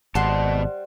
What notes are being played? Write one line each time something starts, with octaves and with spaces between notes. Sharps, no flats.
G#1 B2 G3 C5 F#5 A5 C6